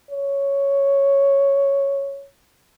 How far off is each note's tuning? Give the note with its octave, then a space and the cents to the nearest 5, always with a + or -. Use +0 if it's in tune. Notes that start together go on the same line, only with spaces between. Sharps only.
C#5 +0